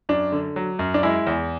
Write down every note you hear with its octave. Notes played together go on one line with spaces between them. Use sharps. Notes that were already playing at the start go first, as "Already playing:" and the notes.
F#2 D4
D3
F#3
F#2
D4
G#3 E4
E2